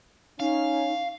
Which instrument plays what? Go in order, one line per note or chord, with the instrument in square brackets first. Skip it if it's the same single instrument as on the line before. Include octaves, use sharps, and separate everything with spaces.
[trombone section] C#4 [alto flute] D#4 [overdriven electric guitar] F5